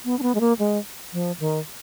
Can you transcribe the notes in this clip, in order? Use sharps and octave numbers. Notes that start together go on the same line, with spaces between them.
B3
D4
B3
G#3
A#3
G#3
F3
D#3